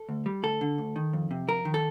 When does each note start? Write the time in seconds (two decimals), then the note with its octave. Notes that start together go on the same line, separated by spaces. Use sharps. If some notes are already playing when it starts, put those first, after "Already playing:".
Already playing: A4
0.09 D2
0.26 G3
0.43 D2 A4
0.61 D3
0.78 D2
0.96 D#3
1.13 F2
1.31 C3
1.48 F2 A#4
1.65 D#3
1.74 A4